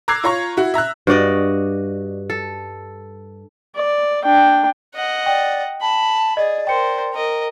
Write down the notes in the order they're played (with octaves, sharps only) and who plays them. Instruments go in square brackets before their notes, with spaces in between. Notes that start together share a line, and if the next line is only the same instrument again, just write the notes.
[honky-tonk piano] A#5 D6 E6 F#6 G#6 C7
F4 C#5 A#5 C#6
E4 F#4
E5 A#5 E6 F#6
[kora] G2 F#4 D5 D#5
A4
[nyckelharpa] D5
D4 G5
[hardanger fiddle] D#5 F#5
[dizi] D5 [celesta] G5
[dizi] A5 [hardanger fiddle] B5
[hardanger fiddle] G#4 [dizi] D5 [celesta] D#5
[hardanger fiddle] A#4 C5 [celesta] G5 C#7
[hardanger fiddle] A#4 D#5